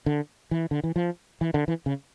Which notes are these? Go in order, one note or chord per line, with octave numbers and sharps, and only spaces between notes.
D3
E3
D3
E3
F3
E3
D3
E3
C#3